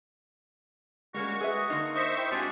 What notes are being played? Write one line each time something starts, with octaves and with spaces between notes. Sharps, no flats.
G3 G#3 A#3 C#4 F#4 C#6
G#4 B4 E5 D#6
D3 A#3 D#4
C5 D#5 E5 C#6
E4 G5
G2 G#3 C4 D4 F#4 C#5 G#5 A6